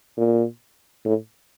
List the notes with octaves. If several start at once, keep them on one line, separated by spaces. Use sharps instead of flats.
A#2
A2